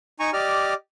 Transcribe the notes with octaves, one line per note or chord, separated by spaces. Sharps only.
D#4 G#5 A#5 C#6
G4 D5 D#5 F6